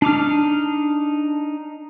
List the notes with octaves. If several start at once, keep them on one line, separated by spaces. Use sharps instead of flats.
D4 D#4 D6 F6